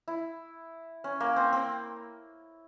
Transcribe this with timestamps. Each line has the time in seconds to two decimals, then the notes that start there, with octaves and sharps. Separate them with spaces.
0.08 E4
1.04 C#4
1.20 A#3
1.36 C4
1.53 C4